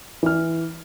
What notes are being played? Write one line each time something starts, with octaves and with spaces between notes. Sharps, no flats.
E3 F6